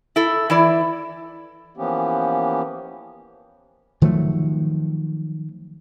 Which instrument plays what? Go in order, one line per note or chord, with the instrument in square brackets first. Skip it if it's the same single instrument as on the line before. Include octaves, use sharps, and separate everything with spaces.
[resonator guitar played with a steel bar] E4 A4
E3 E4 D5
[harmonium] E3 F3 A#3 B3 C#4 G4
[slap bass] D#3 F3 F#3 A3